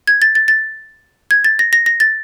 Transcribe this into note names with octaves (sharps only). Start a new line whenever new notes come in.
G#6
A6
A6
A6
G#6
A6
A#6
A#6
A#6
A6